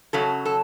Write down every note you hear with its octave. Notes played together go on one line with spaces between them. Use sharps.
F#2 C#3 F#3 A4
A4